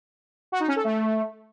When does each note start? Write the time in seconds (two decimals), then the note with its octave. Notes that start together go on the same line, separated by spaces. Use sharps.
0.52 F#4
0.60 D#4
0.68 C#4
0.76 A4
0.84 A3